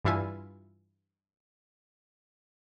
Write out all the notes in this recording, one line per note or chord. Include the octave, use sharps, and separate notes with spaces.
G2 E3 E4 F4 G#5